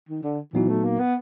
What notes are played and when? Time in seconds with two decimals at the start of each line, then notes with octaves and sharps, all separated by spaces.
0.09 D#3
0.23 D3
0.53 A#2 E3 F#3 B3 D#4 F#4
0.68 A3
0.84 A#3
0.99 B3